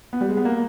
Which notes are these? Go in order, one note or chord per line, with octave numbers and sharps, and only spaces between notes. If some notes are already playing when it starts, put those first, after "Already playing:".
B3
G3
G#3
B3
A#3